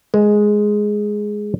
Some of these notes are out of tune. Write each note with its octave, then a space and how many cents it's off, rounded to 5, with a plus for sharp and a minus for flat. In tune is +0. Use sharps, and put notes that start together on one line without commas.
G#3 +5